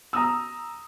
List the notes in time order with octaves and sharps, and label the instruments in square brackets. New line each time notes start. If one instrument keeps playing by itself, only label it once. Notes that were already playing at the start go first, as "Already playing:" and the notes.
[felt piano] A#5 D#6 E6